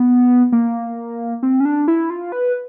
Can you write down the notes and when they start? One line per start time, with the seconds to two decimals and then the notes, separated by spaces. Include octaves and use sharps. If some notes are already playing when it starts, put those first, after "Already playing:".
Already playing: B3
0.52 A#3
1.43 C4
1.60 C#4
1.65 D4
1.88 E4
2.10 F4
2.32 B4